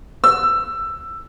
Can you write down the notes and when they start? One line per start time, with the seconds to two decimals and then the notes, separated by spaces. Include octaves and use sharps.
0.24 E6